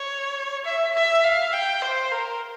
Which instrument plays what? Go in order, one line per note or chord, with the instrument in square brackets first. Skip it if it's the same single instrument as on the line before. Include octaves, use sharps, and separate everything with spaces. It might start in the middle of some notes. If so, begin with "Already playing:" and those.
Already playing: [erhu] C#5
E5
E5
F5
G5
C5
A#4